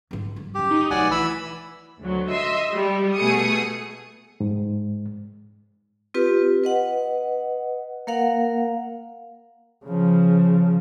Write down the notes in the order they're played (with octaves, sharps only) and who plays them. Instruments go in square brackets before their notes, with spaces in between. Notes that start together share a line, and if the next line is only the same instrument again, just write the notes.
[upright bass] G#2 D3
G3
[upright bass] F#2 C#3 [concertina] G4
[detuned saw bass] D#4
[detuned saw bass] B1 [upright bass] A3 [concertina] D5 F#5 G#5
[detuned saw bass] E3 [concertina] B5 E6
[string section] D2 F#3
D#5 E5 C6
G3
B2 A3 G#4 D#6 C#7
[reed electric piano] G#2
[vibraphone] C4 F4 G4 B4
B4 D#5 F#5
A#3 A#4 F5 F#5
[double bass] C#3 F3